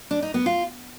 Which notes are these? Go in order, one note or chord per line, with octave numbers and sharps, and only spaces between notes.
D4
D#4
B3
F4